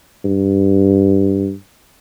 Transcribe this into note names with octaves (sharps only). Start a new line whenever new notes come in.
G2